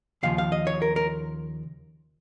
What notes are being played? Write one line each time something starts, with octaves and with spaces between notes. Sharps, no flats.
D#2 C#3 F3 F5
F5
D#5
C#5
A#4
A#4